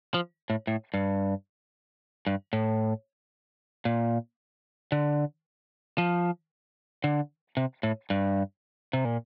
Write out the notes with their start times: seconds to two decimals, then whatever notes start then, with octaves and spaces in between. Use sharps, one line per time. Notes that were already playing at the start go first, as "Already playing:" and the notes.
0.14 F3
0.50 A2
0.67 A2
0.94 G2
2.27 G2
2.53 A2
3.85 A#2
4.92 D3
5.98 F3
7.04 D3
7.57 C3
7.83 A2
8.10 G2
8.93 C3
9.05 A#2